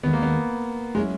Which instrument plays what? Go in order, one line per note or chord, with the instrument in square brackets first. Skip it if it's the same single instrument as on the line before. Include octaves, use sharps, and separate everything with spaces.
[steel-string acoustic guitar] D#2 D#3 G#3 [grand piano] B3
[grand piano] A#3
B3
[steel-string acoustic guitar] F#3 C#4 E4 [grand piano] G#3